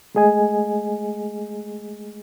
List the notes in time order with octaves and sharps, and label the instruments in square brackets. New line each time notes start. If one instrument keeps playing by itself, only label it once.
[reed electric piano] G#3 A3 G#4 D#5 G#5